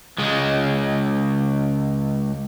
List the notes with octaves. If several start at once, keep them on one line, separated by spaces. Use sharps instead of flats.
C#2 G#3